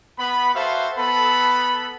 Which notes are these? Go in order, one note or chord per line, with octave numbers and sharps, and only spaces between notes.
B3 B5
F#4 A4 B4 C5 E5 F5
B3 A4 B5